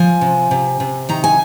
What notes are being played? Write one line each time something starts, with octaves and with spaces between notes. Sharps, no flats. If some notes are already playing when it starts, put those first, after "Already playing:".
Already playing: F3 G#5
C3
C3
C3
D#3 A#5
G#5